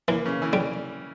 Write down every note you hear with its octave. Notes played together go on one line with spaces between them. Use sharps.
E3 A#3
C#3
E3
G3